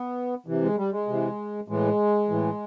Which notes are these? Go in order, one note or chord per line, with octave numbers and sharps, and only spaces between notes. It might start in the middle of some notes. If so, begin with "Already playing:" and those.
Already playing: B3
C3 E3
G#3
G3
G#3
C3 E3
A2 E3 G#3
A2 E3